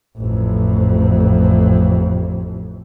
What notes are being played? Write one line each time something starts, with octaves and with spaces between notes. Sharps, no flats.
A1 F2